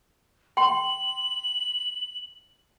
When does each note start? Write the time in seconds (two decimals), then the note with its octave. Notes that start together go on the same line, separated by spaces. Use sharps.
0.57 G5 C6 F#7